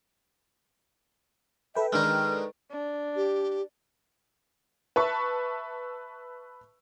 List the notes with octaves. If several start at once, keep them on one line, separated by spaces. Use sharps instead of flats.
A4 B4 E5 G5
D#3 G#3 D4 D#4 A#4 F6
D4
G4
B4 E5 A5 C#6